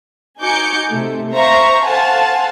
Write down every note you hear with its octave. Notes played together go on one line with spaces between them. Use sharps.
D#4 F#4 G#5 D6 G6 C#7
C3 A3
C5 E5 F5 A#5 C#6
A4 C5 F5 F#5 G#5 A5